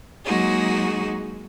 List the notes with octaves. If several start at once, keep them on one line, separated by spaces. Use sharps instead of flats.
F#3 G#3 A#3 D#4 F#4 G#4